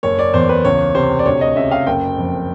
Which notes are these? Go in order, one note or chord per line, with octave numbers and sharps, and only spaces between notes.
F#1 C#5
D5
E2 C5
B4
C#2 C#5
C3 C5
D5
D2 C#5
D#5
C#3 E5
F5
F#1 G5
F2